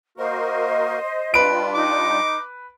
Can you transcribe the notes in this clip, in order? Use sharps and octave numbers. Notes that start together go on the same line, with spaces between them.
A#3 F#4 A#4 C5 D#5
G3 D4 F4 B4 D7
D#4 D6